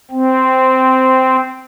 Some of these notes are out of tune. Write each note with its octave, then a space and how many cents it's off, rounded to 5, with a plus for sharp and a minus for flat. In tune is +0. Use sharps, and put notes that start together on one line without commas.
C4 -10